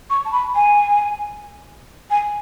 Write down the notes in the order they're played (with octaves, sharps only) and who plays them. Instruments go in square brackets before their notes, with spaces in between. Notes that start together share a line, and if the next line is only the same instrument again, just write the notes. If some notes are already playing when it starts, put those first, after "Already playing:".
[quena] C#6
A5
B5
G#5
G#5